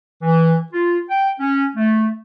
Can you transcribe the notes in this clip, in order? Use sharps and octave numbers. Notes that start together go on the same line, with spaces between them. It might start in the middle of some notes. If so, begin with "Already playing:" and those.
E3
F4
G5
C#4
A3